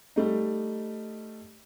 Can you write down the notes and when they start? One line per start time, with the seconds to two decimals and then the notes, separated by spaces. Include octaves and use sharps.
0.16 G3 A3 D#4